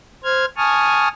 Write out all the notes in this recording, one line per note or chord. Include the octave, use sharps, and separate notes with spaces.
C5 F6 G#6
G#5 A5 C#6 D#6 F6